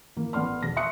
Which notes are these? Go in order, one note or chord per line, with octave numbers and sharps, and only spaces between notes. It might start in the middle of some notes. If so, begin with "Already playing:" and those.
E3 A#3
A1 B3 D5 C6 F6
E1 A#6
E5 C6 C#6 D#6 F#6 C#7